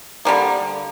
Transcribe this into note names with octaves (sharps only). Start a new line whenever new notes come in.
D3 G3 A#3